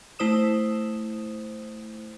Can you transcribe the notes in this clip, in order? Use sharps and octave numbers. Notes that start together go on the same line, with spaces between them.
A3 E4 C5 D#6 E7